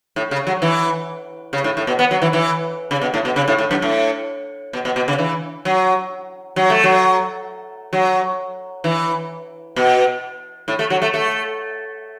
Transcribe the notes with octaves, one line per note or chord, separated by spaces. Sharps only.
A2
C#3
F#3
E3
C#3
A2
A2
B2
B3
F#3
E3
E3
C#3
B2
A2
B2
C#3
A2
A2
F#2
A2
B2
B2
B2
C#3
E3
F#3
F#3
A3
F#3
F#3
E3
B2
A2
A3
F#3
A3
A3